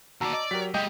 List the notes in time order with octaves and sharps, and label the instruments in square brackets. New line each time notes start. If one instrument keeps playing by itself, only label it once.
[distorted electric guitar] D#2 D5 [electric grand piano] F#4 [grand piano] A5 A#5 E6
[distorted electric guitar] D5 [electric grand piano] D#5
[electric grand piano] F#3 G4 A#4 [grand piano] B6
[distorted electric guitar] G#3 G4 [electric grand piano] D#5 [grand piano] G5 D#6 G6